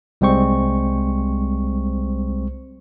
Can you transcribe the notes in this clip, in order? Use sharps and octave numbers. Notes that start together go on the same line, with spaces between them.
C2 G3 G#3 C4 C5 C#6